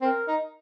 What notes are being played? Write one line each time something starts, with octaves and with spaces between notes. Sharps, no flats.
C4 A#4
D#4